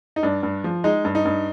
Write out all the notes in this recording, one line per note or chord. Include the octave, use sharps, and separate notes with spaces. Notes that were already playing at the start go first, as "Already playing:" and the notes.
D#4
G2 D4
G2
F3
G#3 D#4
G2
D#4
G2